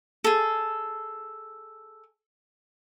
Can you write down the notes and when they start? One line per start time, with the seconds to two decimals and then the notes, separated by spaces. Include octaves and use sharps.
0.24 G#4 A4